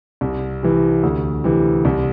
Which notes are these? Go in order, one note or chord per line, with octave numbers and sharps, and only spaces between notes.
C2
C3 E3
D2
C3 E3
C2